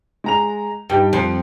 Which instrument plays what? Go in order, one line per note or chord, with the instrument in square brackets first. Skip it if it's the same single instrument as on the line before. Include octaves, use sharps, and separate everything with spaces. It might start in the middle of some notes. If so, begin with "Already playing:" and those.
[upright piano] G#3 A#5 F7
[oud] G2 [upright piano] D#4 G4 G5
[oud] F2 [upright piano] F3